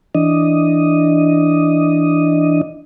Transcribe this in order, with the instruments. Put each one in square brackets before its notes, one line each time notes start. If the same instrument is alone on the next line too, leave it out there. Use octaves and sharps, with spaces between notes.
[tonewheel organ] E3 D4 D#5